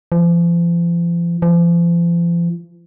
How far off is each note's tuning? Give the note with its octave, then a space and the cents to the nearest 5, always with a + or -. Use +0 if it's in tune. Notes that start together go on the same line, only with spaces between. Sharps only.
F3 -40
F3 -40